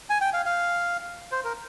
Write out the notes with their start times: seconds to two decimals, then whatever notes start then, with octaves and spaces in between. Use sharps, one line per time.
0.10 G#5
0.21 G5
0.33 F5
0.46 F5
1.32 C5
1.44 A#4